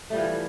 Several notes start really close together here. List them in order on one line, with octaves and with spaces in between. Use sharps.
A3 G3 F3 E3